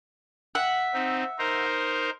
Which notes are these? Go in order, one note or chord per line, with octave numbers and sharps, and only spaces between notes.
E5 F#5
C4 D#4
D#4 A#4 C5